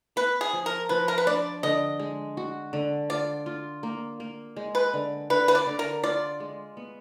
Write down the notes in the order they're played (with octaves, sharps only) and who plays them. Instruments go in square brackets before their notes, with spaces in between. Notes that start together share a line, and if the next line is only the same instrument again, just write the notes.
[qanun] B3 [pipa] B4
[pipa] G#4
[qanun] F3
[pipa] A#4
[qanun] F3 [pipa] B4
[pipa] A#4
B4
[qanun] D4 [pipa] D5
[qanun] D3 [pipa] D#5
[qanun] G#3
F#4
D3
[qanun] F4 [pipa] D5
[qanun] F4
A#3
A#3
G#3
[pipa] B4
[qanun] D3
[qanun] D3 [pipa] B4
[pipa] B4
D5
[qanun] D3
[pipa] A#4
[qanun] F4 [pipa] D5
[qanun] G#3
B3